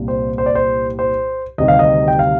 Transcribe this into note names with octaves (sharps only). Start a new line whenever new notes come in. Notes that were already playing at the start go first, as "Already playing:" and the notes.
Already playing: C2 A#2 G3
C5
C5
D5
C5
C5
D2 C3 D#3 G3 D#5
F5
D#5
G5
F5